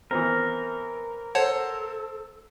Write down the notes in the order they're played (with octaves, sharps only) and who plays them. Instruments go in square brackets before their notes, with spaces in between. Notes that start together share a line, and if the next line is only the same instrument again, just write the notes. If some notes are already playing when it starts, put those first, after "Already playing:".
[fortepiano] E3 B3 C4 [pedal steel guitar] A#4
[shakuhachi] A4 [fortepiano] C5 [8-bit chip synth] C#5 F#5 A5